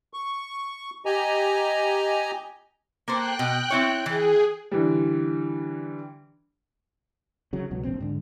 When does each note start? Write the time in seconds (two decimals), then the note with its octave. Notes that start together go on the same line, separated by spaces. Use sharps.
0.14 C#6
1.06 G4 D#5 G#5 A#5
3.08 A#3 A4 C5 G5 F#6
3.39 B2
3.70 C4 E4 C#5
4.06 E3 G#4
4.71 D3 E3 G3
7.53 C#3 F#3
7.71 C#2 B2 F#3
7.84 F1 A#1 C4
8.00 G#2 D3